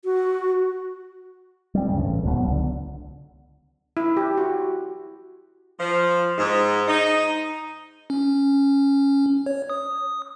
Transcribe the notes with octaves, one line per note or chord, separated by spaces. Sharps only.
F#4
G3 C4
D2 G2 C#3
A1
D1 C#2 G#2 B2
F#3 B3
C#2 D3
E4
G4
F#4
F3
G#2
D#4
C#4
C#5
D#6